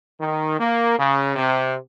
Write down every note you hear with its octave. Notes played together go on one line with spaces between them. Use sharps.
D#3
A#3
C#3
C3